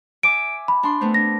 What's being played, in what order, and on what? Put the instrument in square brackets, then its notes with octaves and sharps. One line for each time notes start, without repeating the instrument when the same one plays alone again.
[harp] E5 G#5 D6 [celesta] D7
[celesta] B5
[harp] D4 C6
A3 B3 C4
[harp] D4 [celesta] A#6